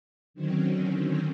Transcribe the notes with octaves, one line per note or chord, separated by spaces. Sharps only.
D3 D#3 F#3 C4 C#4